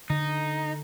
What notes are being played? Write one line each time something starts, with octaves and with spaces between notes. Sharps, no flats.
D3 D#4